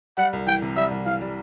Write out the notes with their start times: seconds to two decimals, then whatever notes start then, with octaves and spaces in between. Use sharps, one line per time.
0.17 G3 F#5
0.33 C2
0.47 E3 G5
0.62 C3
0.77 G3 E5
0.91 C2
1.06 E3 F5
1.21 G3